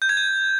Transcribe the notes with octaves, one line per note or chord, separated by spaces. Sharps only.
G6
G#6
G6